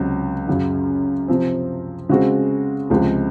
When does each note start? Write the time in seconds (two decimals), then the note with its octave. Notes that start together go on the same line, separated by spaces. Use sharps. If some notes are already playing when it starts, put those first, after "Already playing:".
Already playing: C#2 C3 F#3
0.48 F#2 C#3 F#3
1.28 C3 F3 C4
2.09 C#3 G#3 C4 F#4
2.90 C#2 C3 F3 G#3